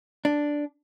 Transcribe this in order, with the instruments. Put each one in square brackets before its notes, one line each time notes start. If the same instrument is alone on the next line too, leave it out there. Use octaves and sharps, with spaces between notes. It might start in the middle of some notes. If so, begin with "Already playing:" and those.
[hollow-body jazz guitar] D4